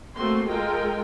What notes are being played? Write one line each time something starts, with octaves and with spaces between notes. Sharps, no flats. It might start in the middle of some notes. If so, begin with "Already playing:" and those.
A3 A#3 C4 F#4 C6
G#3 F4 A4 A#4 G5